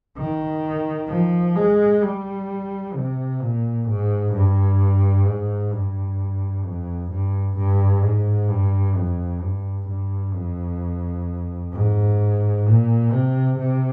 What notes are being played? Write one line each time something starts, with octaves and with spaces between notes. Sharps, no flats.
D#3
F3
G#3
G3
C3
A#2
G#2
G2
G#2
G2
F2
G2
G2
G#2
G2
F2
G2
G2
F2
G#2
A#2
C3
C3